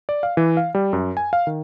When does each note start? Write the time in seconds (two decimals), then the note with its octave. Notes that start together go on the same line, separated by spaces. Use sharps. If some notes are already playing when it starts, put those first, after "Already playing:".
0.09 D5
0.23 F5
0.37 E3
0.57 F5
0.75 G3
0.93 F#2
1.17 G#5
1.33 F5
1.47 D#3